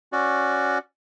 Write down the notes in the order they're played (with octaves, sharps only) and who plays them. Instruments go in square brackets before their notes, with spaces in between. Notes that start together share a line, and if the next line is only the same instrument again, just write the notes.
[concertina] C#4 F#4 D5